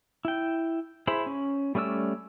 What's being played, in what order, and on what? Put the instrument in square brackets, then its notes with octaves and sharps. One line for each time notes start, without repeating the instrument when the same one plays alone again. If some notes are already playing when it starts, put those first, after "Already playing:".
[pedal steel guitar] E4 G5
E4 G#4 C5 B5
C#4
G3 A3 C#4 D5 E6